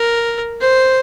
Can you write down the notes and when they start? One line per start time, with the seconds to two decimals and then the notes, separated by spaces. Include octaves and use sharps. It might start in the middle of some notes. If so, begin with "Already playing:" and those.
Already playing: A#4
0.61 C5